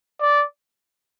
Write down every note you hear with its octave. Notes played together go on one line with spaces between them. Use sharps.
D5